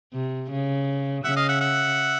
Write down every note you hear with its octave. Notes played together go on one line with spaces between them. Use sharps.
C3
C#3
C#3 E5 F#5
D#5 F5
E5 F#5
E5 F#5